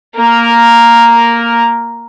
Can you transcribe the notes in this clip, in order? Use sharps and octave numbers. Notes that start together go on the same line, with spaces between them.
A#3 A#4